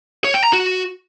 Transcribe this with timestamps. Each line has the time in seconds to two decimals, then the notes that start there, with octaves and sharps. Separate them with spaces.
0.25 C#5
0.34 G5
0.44 A#5
0.53 F#4